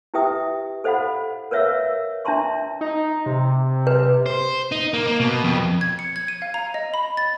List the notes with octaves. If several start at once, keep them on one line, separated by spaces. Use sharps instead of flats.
E4 G4 B4 E5 G5 D#6
A4 C5 D#5 F5 F#5 B5
A#4 B4 C#5 E5 F5 E6
D4 E5 A5 A#5 C6 C#6
D#4
C3
B4
C5
D#4
A#3
A#3
B2
F2
G#6
C#7
G#6
D#7
F5
A#5
D#5
B5
A6